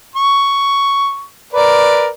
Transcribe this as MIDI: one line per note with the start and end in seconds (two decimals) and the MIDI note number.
0.15 1.23 85
1.53 2.08 70
1.53 2.08 71
1.53 2.08 74